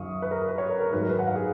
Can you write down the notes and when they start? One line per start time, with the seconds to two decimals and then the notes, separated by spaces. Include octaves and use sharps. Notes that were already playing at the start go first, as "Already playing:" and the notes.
Already playing: F#2 D#3 F#3 F5 C#6 D#6
0.22 B4
0.31 A#4
0.48 B4
0.58 C#5
0.69 A#4
0.80 A#4
0.92 G#2 D#3 F#3 B4
1.02 A#4
1.09 B4
1.19 F#5
1.27 F5
1.35 G#4